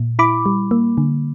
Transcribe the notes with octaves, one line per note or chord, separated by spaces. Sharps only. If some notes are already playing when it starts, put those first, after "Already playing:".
Already playing: A#2
E4 B5 D6
G3
A#3
D3